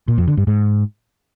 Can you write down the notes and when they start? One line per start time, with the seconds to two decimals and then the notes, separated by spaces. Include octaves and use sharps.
0.08 A#2
0.18 F2
0.28 D3
0.37 G2
0.47 G#2